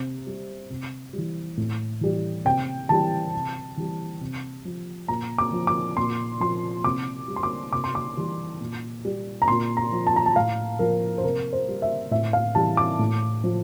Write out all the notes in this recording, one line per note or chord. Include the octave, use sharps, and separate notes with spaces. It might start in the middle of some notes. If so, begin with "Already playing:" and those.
Already playing: C3
G3
C3
E3 G3
A2
E3 G3
C3 G5
E3 G3 A5
C3
E3 G3
C3
F3
A#2 A#5
D6
F3
D6
A#2 C6
F3 C6
C3 D6
G3
C6
D6
C3 D6
C6
D6
E3 G3
A#2
G3
A#5
A#2 C6
A#5
F3
A5
A#5
A5
A2 F5
F3 A#4
C5
C3 A#4
C5
G3
E5
A2 E5
F5
E3 G3 A5
D6
A2
F3